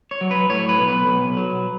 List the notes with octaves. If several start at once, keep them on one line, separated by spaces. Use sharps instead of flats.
C#5
F#3
B4
A2 C#5
B4
B1
B4
B1
F#3